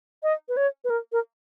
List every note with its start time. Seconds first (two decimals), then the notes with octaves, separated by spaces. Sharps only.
0.23 D#5
0.49 B4
0.57 C#5
0.84 B4
0.90 A#4
1.12 A#4